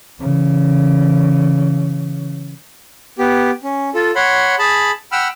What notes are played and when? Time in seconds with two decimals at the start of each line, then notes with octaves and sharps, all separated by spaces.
0.20 C#3 E3
3.19 B3 G4
3.63 C#4
3.95 F4 A4
4.15 C#5 F#5 B5 C6
4.59 G#4 A5 B5
5.12 F#5 G5 B5 E6 F6